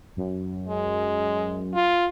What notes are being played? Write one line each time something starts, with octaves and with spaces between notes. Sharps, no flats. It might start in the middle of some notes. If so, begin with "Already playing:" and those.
F#2
G#3
F4